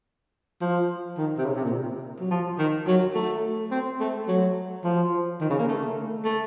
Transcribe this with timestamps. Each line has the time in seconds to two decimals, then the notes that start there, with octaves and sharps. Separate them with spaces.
0.61 F3
1.18 D#3
1.38 C3
1.45 C#3
1.56 C3
1.64 A#2
2.20 F#3
2.31 F3
2.59 D#3
2.87 F#3
3.15 A3
3.71 C4
4.00 A3
4.28 F#3
4.84 F3
5.40 D#3
5.50 C#3
5.59 A#3
5.69 A3
6.24 A3